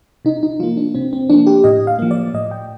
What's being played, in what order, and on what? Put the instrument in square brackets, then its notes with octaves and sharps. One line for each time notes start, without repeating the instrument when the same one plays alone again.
[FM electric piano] C3 D#4
D#4
F3 A#3 F4
D4
C3 C4
C4
F3 A#3 D4
G4
A2 D#5
F5
F3 A#3
D5
A2 D#5
G5